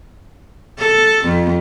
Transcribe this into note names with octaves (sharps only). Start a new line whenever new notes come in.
A4
F2